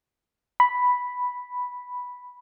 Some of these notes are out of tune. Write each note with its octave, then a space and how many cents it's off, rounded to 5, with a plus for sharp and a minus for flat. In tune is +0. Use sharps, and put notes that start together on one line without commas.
B5 +0